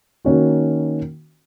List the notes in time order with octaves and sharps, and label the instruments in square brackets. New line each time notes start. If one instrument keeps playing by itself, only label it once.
[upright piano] D#3 A#3 C#4 F#4